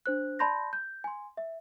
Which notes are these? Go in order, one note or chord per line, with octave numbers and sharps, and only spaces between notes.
D4 C5 F#6
D5 A5 B5 C6 G6 A#6
G6
G#5 C6
E5